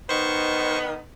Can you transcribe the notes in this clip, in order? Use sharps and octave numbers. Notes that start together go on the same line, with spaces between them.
D#3 B3 D#4 C5 C#6